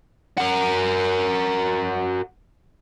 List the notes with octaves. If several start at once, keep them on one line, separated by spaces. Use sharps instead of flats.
F#4 A#4